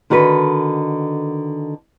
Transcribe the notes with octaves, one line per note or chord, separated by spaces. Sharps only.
D3 D#3 F#4 A4 B4